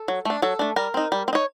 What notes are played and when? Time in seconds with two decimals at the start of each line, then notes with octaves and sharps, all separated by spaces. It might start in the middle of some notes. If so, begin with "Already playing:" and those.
Already playing: A4
0.08 F#3
0.25 A3 D4
0.42 F#3 A4
0.59 A3 D4
0.76 G3 A#4
0.94 C4 D#4
1.12 G3
1.28 C4
1.33 D#4 C#5